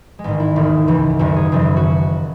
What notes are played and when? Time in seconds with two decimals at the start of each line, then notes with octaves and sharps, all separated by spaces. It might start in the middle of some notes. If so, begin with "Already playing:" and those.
0.19 G#3
0.24 A1 G#2 D#3 A3
0.40 E4
0.56 E1 D#2 D#3
0.88 C#2 C#3 E3
1.19 F#1 F#2 D#3 F#4
1.36 G#4
1.52 F#1 F#2 C#3 E3
1.76 F#4